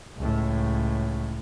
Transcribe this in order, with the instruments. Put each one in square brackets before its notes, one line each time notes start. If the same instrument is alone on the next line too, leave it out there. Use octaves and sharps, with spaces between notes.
[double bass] C#2 A2